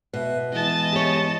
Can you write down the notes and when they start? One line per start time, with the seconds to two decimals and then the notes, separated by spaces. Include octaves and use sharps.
0.14 B2 B4 E5
0.53 E3 G#3 B3 D#5 A5
0.93 G4 C#5